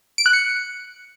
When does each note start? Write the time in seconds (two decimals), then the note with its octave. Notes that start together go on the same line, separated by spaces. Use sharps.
0.18 D7
0.26 F#6
0.33 C#7